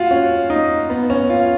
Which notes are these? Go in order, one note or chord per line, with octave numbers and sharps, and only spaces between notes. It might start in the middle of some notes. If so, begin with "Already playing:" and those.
Already playing: F4 F#4
C#4
D#4
B3
C#4
F4